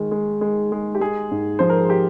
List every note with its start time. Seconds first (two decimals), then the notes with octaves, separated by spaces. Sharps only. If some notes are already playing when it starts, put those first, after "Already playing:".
Already playing: D#3 G#3
0.11 G#3
0.41 G#3
0.72 G#3
0.95 G4
1.01 G#3 G#4
1.31 G#2
1.59 F3 C5
1.70 A#4
1.79 G#4
1.90 G4